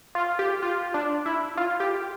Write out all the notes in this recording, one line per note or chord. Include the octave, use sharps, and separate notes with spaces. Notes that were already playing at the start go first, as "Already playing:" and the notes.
F4
G4
F4
D4
E4
F4
G4